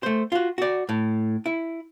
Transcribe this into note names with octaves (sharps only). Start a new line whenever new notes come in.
A3 C5
F4 F#4
F#4 D5
A2
E4